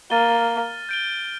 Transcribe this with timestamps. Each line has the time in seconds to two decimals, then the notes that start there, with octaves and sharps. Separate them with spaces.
0.10 A#3 F6 A6 D#7 G7
0.89 G6 D7 G7